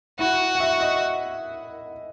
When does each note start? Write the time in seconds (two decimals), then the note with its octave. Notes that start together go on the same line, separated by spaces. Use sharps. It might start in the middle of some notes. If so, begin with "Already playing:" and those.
0.19 E4 F#4
0.55 F#5
0.60 E5
0.81 D#5